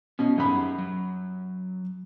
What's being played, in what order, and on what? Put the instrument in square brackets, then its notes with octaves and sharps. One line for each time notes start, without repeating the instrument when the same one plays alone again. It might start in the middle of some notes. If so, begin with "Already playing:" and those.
[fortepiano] B2 [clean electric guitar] C#4 G#5
[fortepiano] F#2 B5 [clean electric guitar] D#4 G4 G#4
[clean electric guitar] F#3